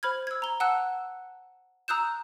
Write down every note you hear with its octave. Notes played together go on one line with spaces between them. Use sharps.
C5 B5 F6 G#6
E6 G#6
A#5 G7
F#5 A5 E6 F#6
A#5 D#6 E6 F#6 G6 E7